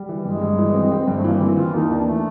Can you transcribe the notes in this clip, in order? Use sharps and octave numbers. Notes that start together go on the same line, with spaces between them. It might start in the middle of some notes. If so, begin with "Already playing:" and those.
Already playing: G3
E3
G2 G#3
G2
E3
C4
C4
G2
A3
E3 A#3
E3 C4
E3 F4
D#2 D#4
E3 D4
A3